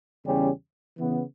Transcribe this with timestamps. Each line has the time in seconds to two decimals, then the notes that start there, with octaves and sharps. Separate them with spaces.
0.23 E2 C#3 G3 C#4 G4
0.97 C#3 E3 B3